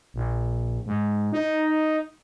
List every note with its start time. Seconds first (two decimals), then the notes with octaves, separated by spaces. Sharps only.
0.14 A#1
0.86 G#2
1.32 D#4